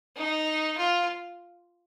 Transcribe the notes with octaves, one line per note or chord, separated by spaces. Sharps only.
D#4
F4